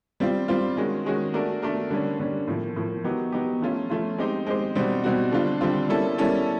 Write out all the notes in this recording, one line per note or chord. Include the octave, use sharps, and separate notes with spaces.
G3 C4 F4
G3 C4 F4
D#3 G#3 C#4 F#4
D#3 G#3 C#4 F#4
A3 D4 F#4 A#4
A3 D4 F#4 A#4
D3 G3 A#3 C#4
D3 G3 A#3 C#4
A2 F3 A#3
A2 F3 A#3
F#3 B3 D#4 G4
F#3 B3 D#4 G4
F3 A3 C#4 F4
F3 A3 C#4 F4
G#3 C4 D#4 G4 C5
G#3 C4 D#4 G4 C5
B2 G3 C4 D#4 F#4
B2 G3 C4 D#4 F#4
D3 G3 C4 F4
D3 G3 C4 F4
G3 A#3 C#4 E4 A4
G3 A#3 C#4 E4 A4